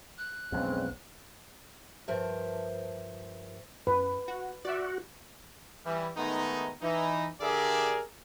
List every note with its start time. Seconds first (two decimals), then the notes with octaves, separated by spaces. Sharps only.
0.18 F#6
0.52 B1 F2 C#3 G#3 C4
2.08 G2 F3 A#4 C5 E5
3.87 F#2 B4
4.28 F#4
4.65 F#4 D5 E5
5.85 E3 G3
6.16 D#3 G#3 A3 B3 D#4
6.82 E3 D#4
7.41 D3 G4 G#4 A#4 D5 E5